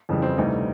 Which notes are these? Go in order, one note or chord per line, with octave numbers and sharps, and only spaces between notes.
F2 C#3 E3 G3
C4
D2 C3 E3 G3 D#4